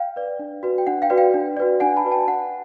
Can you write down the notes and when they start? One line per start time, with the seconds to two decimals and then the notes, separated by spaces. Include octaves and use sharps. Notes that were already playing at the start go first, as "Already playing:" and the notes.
Already playing: F5 G5
0.16 B4 D5
0.39 D4
0.63 F#4 B4 D5
0.78 G5
0.87 D4 F#5
1.02 F5 G5
1.10 F#4 B4 D5
1.18 F5 G5
1.34 D4
1.57 F#4 B4 D5
1.80 D4 F#5 G#5
1.97 A5 B5
2.04 F#4 B4 D5
2.11 G5 A5
2.27 D4 F#5